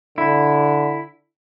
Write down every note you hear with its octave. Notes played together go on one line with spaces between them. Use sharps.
D3 E4